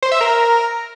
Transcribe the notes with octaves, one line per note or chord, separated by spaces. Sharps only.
C5
E5
A#4